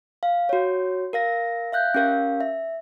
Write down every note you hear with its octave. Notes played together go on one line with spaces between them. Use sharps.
F5
F#4 C#5
A#4 F5 A#6
E5 F5 F#6 G6
C#4 G4 A#4 F5
E5